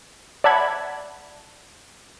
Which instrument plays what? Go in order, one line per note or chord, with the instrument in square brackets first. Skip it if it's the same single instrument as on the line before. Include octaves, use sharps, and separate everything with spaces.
[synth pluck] D5 E5 F#5 A5 B5 G#6